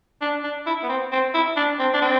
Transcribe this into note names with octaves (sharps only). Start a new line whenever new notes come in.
D4
D4
E4
B3
C4
C4
E4
D4
C4
D4
C4